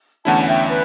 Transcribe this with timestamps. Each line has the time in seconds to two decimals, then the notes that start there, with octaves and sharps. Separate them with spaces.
0.25 E2 D3 A3 C#4 E4 F#5 A5
0.41 F#5
0.48 E5 G5
0.69 B4